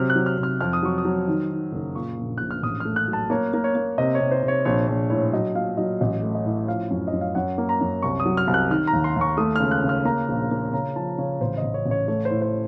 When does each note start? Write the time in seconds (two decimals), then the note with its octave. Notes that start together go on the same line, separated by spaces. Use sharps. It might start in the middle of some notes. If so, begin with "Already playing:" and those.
Already playing: C3 F#3 F6
0.10 F#6
0.15 F#3
0.26 F6
0.38 C3
0.43 F6
0.60 F2 F6
0.73 D#6
0.83 F#3 C#6
0.98 D#6
1.05 F#3
1.28 D#3
1.51 D#3
1.72 F#1
1.95 A#2 C#6
2.18 A#1
2.38 A#1 F#6
2.51 F6
2.62 A1 D#6
2.80 A3 F6
2.96 F#6
3.08 F#3
3.13 A5
3.30 A#3 C#5
3.54 A#3
3.64 C#5
3.75 A#3
3.98 C3 D#5
4.15 C#5
4.20 C3
4.31 C5
4.43 C3
4.48 C#5
4.65 A#1 C#5
4.88 A#1 C#5
5.10 A2 C#5
5.33 F#3 D#5
5.55 A#2 F5
5.77 F#3 D#5
6.01 A1 D#5
6.23 A3
6.35 D#5
6.46 A2
6.68 F3 F5
6.91 F#2
7.08 D#5
7.13 F#2
7.21 F5
7.35 F#2 F#5
7.58 A#3
7.69 A#5
7.81 F#2
8.02 C2 C#6
8.20 D#6
8.26 F#3
8.37 F6
8.47 C2
8.54 F#6
8.70 D#3 F6
8.87 A#5
8.93 D#2
9.04 C6
9.16 D#2
9.21 C#6
9.37 A3 D#6
9.56 C#2 F6
9.71 F#6
9.84 C#3
9.89 F6
10.05 A#3 A#5
10.28 A#1
10.51 A#3
10.73 C#3 A#5
10.96 F3 A5
11.18 C#3 C#5
11.41 A1 C5
11.58 A1 D#5
11.74 C#5
11.86 A1
11.91 C#5
12.08 A3 C#5
12.25 C5
12.30 A2
12.42 C5